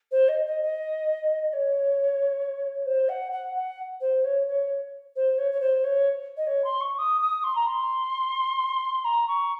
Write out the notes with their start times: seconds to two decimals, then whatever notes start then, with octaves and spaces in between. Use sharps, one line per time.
0.11 C5
0.28 D#5
0.46 D#5
0.62 D#5
1.49 D#5
1.53 C#5
2.86 C5
3.09 F#5
3.32 F#5
3.55 F#5
4.01 C5
4.24 C#5
4.47 C#5
5.16 C5
5.38 C#5
5.52 C#5
5.60 C5
5.84 C#5
6.37 D#5
6.47 C#5
6.64 C6
6.81 C#6
6.98 D#6
7.21 D#6
7.44 C6
7.55 A#5
7.67 C6
9.04 A#5
9.28 C#6